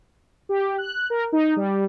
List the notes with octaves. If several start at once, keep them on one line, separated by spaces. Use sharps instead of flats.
G4
F#6
A#4
D#4
G3